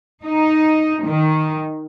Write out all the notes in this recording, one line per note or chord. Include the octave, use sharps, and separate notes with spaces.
D#4
D#3